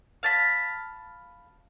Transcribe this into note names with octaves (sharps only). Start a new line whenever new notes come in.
F5 A5 B5